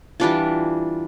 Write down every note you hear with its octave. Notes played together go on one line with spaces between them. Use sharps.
E3 G3 D4 F4